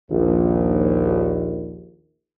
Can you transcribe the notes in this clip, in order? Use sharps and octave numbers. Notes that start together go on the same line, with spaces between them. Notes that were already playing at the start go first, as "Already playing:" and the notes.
A#1 D#2